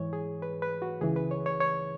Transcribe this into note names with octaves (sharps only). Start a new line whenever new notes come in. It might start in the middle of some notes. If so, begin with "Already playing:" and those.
Already playing: G#2 E3 C#5
G#4
B4
B4
F#4
C#2 C#3 E3 G#4
B4
C#5
C#5
C#5